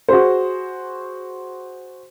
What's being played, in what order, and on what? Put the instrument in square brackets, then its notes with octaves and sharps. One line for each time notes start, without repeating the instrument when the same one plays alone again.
[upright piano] F#4 G#4 C5